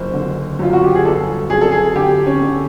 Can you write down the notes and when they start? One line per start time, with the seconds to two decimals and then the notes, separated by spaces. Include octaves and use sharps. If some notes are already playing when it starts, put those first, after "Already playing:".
Already playing: F#1 C5
0.13 D3
0.59 F#2 F4
0.73 F#4
0.84 G4
0.95 G#4
1.04 G1 A4
1.50 F#2 G#4
1.61 A4
1.72 G#4
1.96 D3 G4
2.26 C#4
2.42 D3